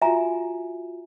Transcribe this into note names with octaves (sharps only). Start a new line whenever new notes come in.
F4 F#4 E5 G#5 A#5